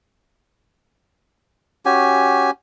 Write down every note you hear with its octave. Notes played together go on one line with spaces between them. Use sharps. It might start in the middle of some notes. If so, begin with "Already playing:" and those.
C#4 F#4 G4 G#5